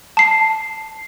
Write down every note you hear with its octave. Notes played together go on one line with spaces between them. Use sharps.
A5 C7